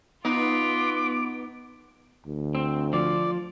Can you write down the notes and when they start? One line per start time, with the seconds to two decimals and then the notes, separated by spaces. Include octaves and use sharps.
0.25 B3 D#4 F4 B4 D6
2.26 D2
2.55 C4
2.93 F3 D5